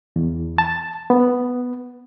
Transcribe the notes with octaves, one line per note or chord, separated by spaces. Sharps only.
E2
A5
B3